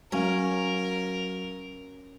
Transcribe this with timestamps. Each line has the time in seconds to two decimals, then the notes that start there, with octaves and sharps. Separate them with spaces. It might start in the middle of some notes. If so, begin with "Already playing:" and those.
0.12 F#3 C#4 A#4 F5